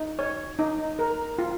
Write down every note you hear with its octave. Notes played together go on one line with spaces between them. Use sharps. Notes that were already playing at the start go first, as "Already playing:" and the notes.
Already playing: D#4
C#5
D#4
A#4
F4